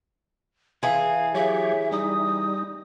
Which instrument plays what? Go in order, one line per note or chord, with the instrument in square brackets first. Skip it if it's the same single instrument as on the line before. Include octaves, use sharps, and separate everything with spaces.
[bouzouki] E3 G#4 [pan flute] F5
[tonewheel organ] F#3 G4 C#5 [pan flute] E5
[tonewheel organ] G3 D#4 [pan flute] D#6